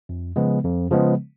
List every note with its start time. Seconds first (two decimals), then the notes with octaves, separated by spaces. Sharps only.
0.09 F2
0.36 C#3 F3 G#3 B3
0.65 F2
0.91 C#3 F3 G#3 B3